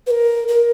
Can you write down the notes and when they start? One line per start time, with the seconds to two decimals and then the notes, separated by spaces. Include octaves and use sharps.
0.07 B4
0.11 A#4
0.48 A#4